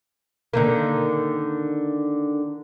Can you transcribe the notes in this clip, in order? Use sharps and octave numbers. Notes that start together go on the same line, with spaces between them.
D3 D#3 A#3